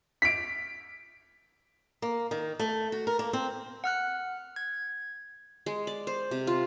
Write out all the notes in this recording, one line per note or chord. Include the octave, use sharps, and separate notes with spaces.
B6 D7
A#3
D#3
A3
F#4
A#4
A#3
C4
F#5 F6 F#6
G#6
G#3
D5
C5
C3
F4